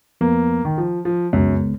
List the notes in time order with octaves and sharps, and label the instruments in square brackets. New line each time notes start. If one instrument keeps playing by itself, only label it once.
[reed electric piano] F2 F3 B3 [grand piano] A#3
[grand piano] D#3
F3
F3
[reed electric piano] C#2 C#3 G#3 B3 [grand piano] F#2